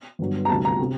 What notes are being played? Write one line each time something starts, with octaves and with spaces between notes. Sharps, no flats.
G1 G2 F#3
A#5
D2 C3 G3 A5
A#5
C3